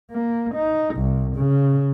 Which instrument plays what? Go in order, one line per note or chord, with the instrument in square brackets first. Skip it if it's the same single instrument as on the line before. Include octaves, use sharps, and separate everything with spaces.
[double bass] A#3
D#4
C2
C#3